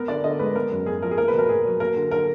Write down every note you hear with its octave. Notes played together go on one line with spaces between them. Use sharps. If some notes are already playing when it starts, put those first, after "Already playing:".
Already playing: B3 A#4
D3 D5
D3 D#5
G#3 B4
B3 A#4
F#2
F#2 G#4
F3 A#4
G#4
A#3 A#4
B4
B2 A#4
B2 G#4
F#3
A#3 A#4
D3
D3 A#4